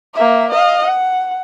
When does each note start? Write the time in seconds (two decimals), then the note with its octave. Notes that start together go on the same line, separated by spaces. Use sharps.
0.14 A#3 E5
0.50 D#5 F5
0.85 F#5